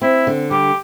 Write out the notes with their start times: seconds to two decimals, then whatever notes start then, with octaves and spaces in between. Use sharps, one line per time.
0.01 C4 E4
0.27 D3
0.51 G3 G4